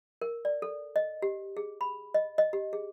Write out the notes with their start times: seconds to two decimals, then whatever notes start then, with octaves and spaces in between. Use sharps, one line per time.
0.21 A#4
0.45 D5
0.62 A4
0.96 D#5
1.22 G4
1.57 G#4
1.81 B5
2.14 D#5
2.38 D#5
2.53 G4
2.73 G#4